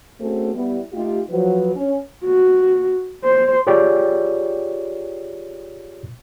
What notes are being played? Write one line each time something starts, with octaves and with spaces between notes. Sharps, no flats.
A3 C4 C#4 F#4 G#4 A4
G3 B3 E4
A3 D#4 F4 G4
F3 F#3 B4
C#4
F#4
C5
F4 G4 G#4 C#5 D5 G5